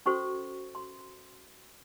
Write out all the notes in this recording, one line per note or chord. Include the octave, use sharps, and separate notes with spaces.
C#4 F#4 A4 C5 C#6
C6